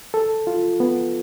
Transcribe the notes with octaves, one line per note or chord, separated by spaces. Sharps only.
A4
F4
B3